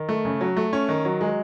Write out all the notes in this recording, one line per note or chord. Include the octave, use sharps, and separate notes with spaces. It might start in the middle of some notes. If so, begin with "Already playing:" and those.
Already playing: D#3
A3
C#3
F#3
A3
C#4
D#3
F#3
G#3